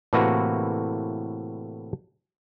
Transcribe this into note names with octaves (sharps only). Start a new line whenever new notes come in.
A2 C3 E3 A#3 F#4 B4